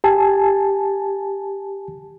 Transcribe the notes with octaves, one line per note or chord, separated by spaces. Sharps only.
G4 G#5 A5